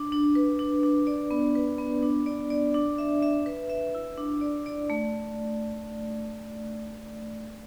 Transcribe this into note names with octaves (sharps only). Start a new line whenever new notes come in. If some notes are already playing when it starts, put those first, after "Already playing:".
Already playing: D4
D4
B4
D4
D4
D5
B3
B4
B3
D4
D5
D5
D4
E5
E5
B4
E5
E4
D4
D5
D5
A3